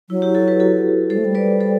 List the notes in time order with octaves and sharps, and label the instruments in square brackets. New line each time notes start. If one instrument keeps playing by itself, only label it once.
[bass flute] F#3 [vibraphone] E4
[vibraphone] E4 G4
F#4 A4
G4 B4
F#4 A4
[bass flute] G3 [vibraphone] A4 C5
[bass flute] A3
G3
[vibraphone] B4 D5
A4 C5